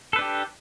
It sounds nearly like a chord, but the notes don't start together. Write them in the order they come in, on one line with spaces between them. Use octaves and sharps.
A4 B4 D4 G4